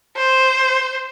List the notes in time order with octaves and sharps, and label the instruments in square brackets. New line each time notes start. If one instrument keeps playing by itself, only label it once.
[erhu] C5